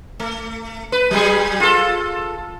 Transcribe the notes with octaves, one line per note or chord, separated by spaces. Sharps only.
A3
B4
F#3 G3 G#4
F4 A4